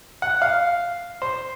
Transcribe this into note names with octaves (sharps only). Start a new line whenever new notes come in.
F#5
F5
C5